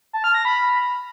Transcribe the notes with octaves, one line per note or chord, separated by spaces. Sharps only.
A5
F6
A#6
B5